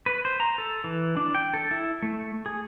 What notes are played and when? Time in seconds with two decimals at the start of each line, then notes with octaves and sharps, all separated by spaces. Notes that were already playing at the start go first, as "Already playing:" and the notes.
0.06 B4
0.25 C5
0.40 A#5
0.58 A4
0.84 E3
1.17 D4
1.34 G5
1.54 A4
1.71 E4
2.02 A3
2.46 G#4